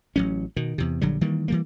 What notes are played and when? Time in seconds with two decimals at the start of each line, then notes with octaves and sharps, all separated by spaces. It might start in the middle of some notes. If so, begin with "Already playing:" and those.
0.16 A1 F#3 C#4
0.56 B2 D#3
0.78 E2 C3
1.01 A#1 D3 F#3 G3
1.21 D#3 E3 G3 A#3
1.48 E3 G3 A#3